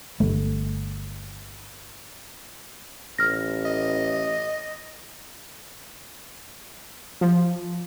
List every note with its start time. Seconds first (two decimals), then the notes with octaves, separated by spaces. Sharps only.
0.20 G1 A3
3.19 A1 F6 A#6
3.66 D#5
7.21 F3